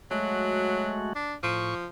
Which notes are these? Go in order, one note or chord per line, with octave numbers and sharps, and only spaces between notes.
F#3 G#3 A3 F#4
D4
A2 F3 C#6